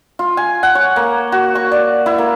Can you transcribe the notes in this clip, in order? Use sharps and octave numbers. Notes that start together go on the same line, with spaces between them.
F4
G#5
F#5
C#5
A#3
F#4
C#6
D5
E4
A#3